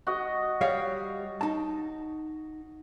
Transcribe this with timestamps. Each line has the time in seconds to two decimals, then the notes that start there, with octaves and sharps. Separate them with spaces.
0.07 F#4 D#5
0.61 G3 C#5 F5
1.41 D#4 A5